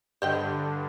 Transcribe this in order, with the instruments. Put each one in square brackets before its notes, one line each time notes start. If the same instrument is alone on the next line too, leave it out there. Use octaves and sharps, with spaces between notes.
[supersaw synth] G2 D3 [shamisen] C5 D#5 G5